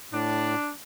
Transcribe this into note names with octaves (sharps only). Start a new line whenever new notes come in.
A2 D4